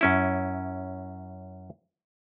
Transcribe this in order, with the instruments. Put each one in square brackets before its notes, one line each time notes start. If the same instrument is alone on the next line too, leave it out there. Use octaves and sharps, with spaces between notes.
[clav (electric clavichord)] F#2 C#4 E4